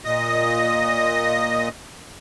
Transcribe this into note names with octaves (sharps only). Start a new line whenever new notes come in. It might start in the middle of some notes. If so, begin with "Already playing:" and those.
A#2 D#5 D#6